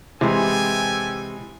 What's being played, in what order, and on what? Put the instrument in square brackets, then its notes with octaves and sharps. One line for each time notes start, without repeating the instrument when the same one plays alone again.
[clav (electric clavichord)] C3 [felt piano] E3 G#3 C6 [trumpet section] G4 A4 G#5